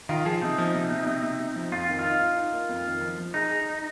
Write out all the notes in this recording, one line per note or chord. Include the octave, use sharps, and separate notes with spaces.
D#3 F4
F3 G#4
C3 D#4
F3
C3
C3
C3
C3
C3
F3
F2 F4
D#3
F4
D#4
D#4
D#4
A#3
F2
D#3
F3
F3
D#4 G#4
G#4